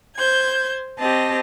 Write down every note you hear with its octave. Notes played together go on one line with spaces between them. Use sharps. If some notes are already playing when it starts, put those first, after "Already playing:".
C5 G6 G#6
C4 G4 D#5 A5